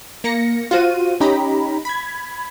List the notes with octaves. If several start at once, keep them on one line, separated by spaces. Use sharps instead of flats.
A#3 A#6 C#7
F4 F#4 C5 D#7
C#4 D#4 G4 A#5 B5
B5 G#6